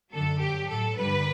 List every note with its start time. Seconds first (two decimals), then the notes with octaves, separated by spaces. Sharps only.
0.11 F#2 D3 F#3 A4
0.40 G2 F#3 G4
0.68 A2 F#3 A4
0.97 G2 D3 G3 B4